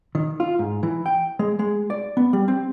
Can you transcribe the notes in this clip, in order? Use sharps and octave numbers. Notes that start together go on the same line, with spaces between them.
D#3
F4
G#2
E3
G5
G#3
G#3
D5
B3
G3
C4